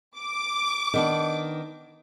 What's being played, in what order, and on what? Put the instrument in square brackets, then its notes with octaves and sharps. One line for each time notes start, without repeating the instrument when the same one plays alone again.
[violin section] D6
[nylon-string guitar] D#3 B3 D4